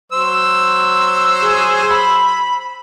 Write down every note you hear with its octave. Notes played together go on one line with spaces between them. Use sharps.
F#3 C5 E6
G#4
B5